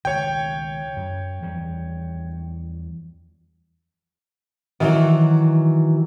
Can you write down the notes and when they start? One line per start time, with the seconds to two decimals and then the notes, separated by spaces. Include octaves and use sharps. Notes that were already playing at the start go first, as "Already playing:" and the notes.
0.05 C#2 B2 D#3 C#5 G5
0.96 F#2
1.42 E2 F3 G3
4.80 D#3 E3 F#3